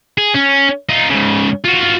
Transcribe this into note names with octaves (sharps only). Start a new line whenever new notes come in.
G#4
C#4
D#4 F4
G#2 C#3
F4 F#4